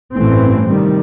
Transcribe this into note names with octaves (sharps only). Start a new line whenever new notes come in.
A1 G2 E3 A3 C4
C3 D#3 G3